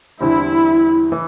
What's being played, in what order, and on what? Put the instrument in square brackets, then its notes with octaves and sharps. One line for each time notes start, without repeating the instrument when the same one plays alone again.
[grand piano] E2 D3 G3 C4 [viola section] E4
[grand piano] E3